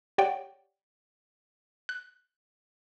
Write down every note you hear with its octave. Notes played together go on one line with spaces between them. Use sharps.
G4 C#5 D5 F#5 G5
F#6